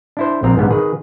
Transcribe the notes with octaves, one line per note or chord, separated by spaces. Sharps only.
D4 E4 C5
A#1 C4 A#5
B1 G#2 D3 B3
D#3 G#4 B4